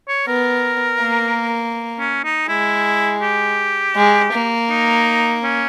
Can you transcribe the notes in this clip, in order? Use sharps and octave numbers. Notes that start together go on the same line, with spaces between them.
C#5
B3 A#4
A#3
C#4
D#4
G#3 E4
G4
G#3
A#3
D#4
C#4